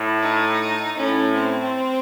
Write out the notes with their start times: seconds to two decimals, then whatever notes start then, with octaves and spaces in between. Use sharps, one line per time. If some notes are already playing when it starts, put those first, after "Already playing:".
Already playing: A2
0.22 D#4
0.97 A2 C#4
1.35 C4